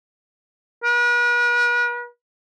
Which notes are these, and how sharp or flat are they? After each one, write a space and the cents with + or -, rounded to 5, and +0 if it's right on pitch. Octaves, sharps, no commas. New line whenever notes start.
B4 -45